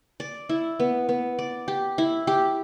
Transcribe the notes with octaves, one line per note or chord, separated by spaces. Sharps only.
D5
E4
B3
B3
D5
G4
E4
G4